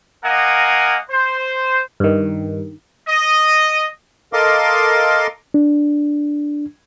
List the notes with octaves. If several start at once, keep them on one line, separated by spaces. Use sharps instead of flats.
A#3 A#4 D#5 F5 F#5 G#5
C5
G2 D#3
D#5
A4 A#4 D#5 F5 C6 D6
D4